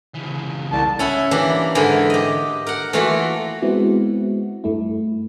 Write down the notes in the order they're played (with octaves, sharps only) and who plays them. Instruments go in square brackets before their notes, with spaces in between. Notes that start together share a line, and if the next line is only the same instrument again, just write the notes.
[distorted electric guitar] C#2 E3
[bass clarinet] C2 [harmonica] A5
[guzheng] C#4 E4 F#5
E3 G3 A#3 D4
G#2 D3 E3 G#4 A#4 B5
G4 D#5
A#4 F#5
E3 A3 A#3 F4 F#4
[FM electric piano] G#3 B3 C4 E4 F#4
G2 A3 E4